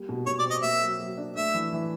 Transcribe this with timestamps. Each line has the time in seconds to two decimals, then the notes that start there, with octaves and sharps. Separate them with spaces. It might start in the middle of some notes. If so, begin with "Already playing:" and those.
Already playing: G3 A#3
0.09 B2
0.26 B2 C#5
0.39 D5
0.45 C4
0.51 D#5
0.63 A#3 E5
0.82 F#3
1.00 F#3
1.18 D4
1.35 A3 E5
1.54 E3
1.73 E3